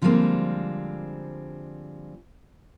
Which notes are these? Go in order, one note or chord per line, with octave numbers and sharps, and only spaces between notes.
D3 F3 G3 G#3 A#3 C4